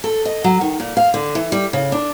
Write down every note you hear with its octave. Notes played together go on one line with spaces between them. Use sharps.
A4
D#5
F#3
D#3
A#2
F5
D3
E3
G3
C#3
D4